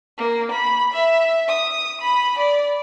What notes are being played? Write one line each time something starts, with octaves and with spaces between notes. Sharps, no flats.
A#3
B5
E5
D#6
B5
D5